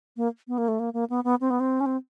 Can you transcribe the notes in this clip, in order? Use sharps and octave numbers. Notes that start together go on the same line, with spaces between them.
A#3
B3
A#3
A3
A#3
A#3
B3
B3
C4
B3
C4
C#4
C4